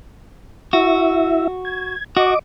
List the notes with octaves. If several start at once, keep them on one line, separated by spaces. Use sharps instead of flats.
E4 F#4 E5
G#6
F#4 D#5 D6